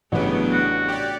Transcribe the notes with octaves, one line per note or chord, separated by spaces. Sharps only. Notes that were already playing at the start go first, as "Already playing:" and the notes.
A1 C#3 F#3 A3 B3 D4
F#4
G4 D5